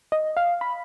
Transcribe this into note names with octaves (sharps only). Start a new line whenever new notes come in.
D#5
F5
B5